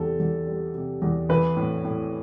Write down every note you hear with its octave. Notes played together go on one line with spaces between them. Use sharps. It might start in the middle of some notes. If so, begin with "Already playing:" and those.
Already playing: E2 C3 A4
E2
G3
C3
E2
E3 B4
A2
A2